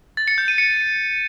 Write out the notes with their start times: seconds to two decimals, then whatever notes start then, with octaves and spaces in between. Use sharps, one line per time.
0.17 A6
0.28 C#7
0.38 G6
0.48 D#7
0.58 C#7